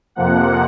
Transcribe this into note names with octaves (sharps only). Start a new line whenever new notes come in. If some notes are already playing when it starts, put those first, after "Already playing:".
F2 C3 F3 A#3 F#5